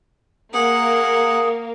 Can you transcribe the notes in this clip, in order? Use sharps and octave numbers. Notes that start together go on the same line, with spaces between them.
A#3 G#4 F#5